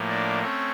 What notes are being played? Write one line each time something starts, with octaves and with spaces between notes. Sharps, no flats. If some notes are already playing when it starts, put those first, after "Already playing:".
Already playing: A2 F3 A#3
D4 D5
A3 C4 C#4 C#5